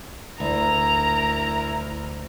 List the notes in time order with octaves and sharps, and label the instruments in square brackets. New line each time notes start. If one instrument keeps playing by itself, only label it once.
[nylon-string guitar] D2 [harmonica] E4 A#4 [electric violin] A#5